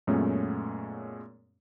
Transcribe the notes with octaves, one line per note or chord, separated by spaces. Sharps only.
F#2 A#2 G#3 A3 B3 C#4